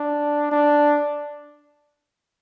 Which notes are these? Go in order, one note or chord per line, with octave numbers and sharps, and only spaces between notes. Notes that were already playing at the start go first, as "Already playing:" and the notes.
Already playing: D4
D4